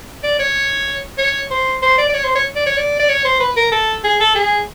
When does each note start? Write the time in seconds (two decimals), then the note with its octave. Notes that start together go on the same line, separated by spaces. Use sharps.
0.23 D5
0.39 C#5
1.18 C#5
1.51 C5
1.82 C5
1.98 D5
2.09 D5
2.14 C#5
2.24 C5
2.35 C#5
2.56 D5
2.66 C#5
2.77 D5
3.00 D5
3.09 C#5
3.25 C5
3.40 B4
3.56 A#4
3.72 A4
4.04 G#4
4.20 A4
4.35 G#4